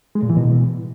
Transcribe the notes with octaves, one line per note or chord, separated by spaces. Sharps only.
G#3
A#2
E3
B2